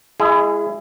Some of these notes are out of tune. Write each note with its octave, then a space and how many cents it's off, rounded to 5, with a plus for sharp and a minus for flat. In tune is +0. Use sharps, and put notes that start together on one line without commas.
G#3 +0 E4 +30 G#4 +0